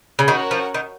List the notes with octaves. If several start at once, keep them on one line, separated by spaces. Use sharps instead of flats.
C#3
D#3 C#4 F#4 A#4 C#5 F#5
F3
D#3